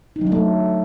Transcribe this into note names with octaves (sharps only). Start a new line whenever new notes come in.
D#4
F#3
D4
A3